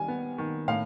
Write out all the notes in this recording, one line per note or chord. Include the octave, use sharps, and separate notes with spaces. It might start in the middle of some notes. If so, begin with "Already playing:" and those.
Already playing: D#3 G3 G#5
B3
D#3
A2 F5